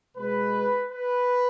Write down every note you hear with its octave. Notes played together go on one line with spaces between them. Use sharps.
B2 G#3 B4
B4